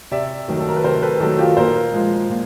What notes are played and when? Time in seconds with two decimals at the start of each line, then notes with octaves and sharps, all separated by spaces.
0.11 C3 D5 E5
0.48 D#3 F#3 A3
0.60 A4
0.69 A#4
0.76 B4
0.84 C3 A#4 C5
1.03 A4 B4
1.20 D#3 F#3 A3 G4 A4
1.39 F4 G4
1.57 A#2 A#4 C5
1.93 F3 G#3
2.30 A#2